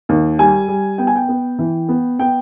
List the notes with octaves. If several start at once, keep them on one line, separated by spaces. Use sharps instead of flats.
D#2
G3 G#5
G3
B3 G5
G#5
G5
B3
E3
B3
B3 G5